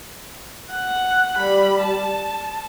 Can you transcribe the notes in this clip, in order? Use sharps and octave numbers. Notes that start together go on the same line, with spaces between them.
F#5
G3 B5
A5